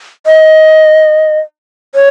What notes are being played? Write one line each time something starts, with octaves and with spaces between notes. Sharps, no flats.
D#5
C#5